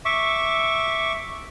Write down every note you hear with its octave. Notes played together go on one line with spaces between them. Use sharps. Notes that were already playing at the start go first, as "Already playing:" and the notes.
E5 C#6 D6